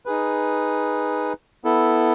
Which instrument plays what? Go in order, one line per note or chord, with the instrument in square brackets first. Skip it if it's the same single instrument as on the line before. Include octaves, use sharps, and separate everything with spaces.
[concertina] D#4 G#4 B4
B3 E4 A4